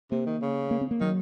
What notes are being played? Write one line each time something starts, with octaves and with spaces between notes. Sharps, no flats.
C3 A#3
D#3
C#3
A#3
C4
A#3
D#3 F#3